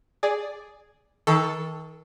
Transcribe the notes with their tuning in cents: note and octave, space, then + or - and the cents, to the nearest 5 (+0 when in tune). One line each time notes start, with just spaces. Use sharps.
G#4 +0 D5 +0
D#3 +40 A4 +0